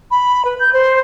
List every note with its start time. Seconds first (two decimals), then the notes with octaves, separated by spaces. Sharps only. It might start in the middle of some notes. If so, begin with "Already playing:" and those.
0.11 B5
0.45 B4
0.59 G6
0.73 C5